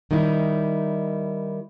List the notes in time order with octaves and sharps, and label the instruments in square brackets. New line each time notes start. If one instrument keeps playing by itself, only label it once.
[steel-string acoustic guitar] D#3 G3 D#4 E4